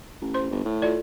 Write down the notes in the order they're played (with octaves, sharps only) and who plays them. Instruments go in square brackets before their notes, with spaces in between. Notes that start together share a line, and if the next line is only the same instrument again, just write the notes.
[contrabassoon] A1
[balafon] C5 C6
[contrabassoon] G1
A2
[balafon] F4 A4 D5